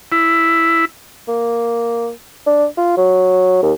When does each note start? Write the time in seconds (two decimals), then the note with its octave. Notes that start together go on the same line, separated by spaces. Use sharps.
0.12 E4
1.28 A#3
2.47 D4
2.77 F4
2.97 F#3
3.63 D#2